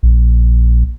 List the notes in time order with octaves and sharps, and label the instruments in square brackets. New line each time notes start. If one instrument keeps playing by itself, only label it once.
[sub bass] A#1